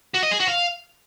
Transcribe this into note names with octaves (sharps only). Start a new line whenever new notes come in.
F#4
D#5
G#4
F#4
F5